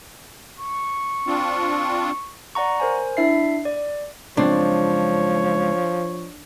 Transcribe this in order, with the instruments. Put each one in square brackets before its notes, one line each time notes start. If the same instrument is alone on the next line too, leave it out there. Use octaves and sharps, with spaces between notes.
[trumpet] C#6
[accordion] C4 D4 F4
[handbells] D5 F#5 A#5 C#6
A#4 C5 G#5
D4 E4 E5 C7
D5
[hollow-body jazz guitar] C#2 F#2 C4 [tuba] F3 [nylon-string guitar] D4 [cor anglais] C#5